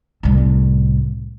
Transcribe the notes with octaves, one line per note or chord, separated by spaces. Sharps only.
C2 A2